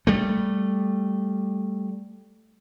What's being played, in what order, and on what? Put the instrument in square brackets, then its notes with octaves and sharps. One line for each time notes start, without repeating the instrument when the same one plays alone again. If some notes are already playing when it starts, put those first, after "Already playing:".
[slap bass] G3 A3